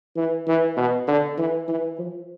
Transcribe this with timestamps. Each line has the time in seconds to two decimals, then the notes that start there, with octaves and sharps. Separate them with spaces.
0.16 E3
0.47 E3
0.77 B2
1.08 D3
1.38 E3
1.68 E3
1.99 F3